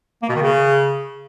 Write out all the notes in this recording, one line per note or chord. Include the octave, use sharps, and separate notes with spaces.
A#3
B2
D#3
C#3